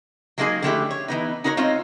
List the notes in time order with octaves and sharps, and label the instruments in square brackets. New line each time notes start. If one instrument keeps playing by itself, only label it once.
[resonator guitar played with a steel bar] F#3 G#3 A#3 D#4 G#4 G#5
D3 F3 A3 B3 E4 G4
C#5
E3 B3 D#4
D#4 F#4 A#4 C5 C#5
G#3 C4 D#4 F4 C#5